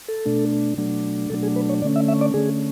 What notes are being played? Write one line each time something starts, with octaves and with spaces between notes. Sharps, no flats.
A4
B2 A3 D4
B2 F#3 A3 D4
B2 F#3 A3 D4 A4
G#4
B4
C#5
D3 A3 C#4 D5
E5
E5
D5
D3 A3 C#4 G#4